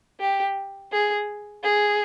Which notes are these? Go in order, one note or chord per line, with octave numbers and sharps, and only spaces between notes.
G4
G#4
G#4